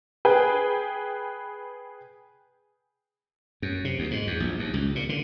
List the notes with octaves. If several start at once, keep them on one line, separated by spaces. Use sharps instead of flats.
G#4 B4 G5
F#2
C3
D2
G#2
E2
A#1
D#2
C#2
A#2
D3